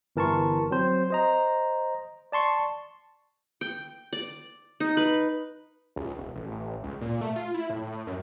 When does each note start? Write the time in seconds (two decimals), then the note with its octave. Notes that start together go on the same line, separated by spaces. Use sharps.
0.16 G1 E3 A#4 A5 C6 C#6
0.71 F#3 C4 C5
1.10 C5 D#5 A#5
2.32 D5 A5 C6 C#6
3.61 G5
4.13 D5
4.80 D#4
4.97 B4
5.96 C#2
6.19 E1
6.35 A1
6.51 A1
6.83 C#2
7.01 A#2
7.21 A3
7.36 F4
7.54 E4
7.69 A2
7.87 A2
8.07 F#2